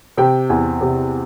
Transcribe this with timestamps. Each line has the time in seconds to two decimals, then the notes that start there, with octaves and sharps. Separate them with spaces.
0.17 C3 G5
0.49 E2 G#5
0.81 C3